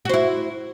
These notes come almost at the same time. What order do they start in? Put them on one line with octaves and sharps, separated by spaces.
F#4 C5 E4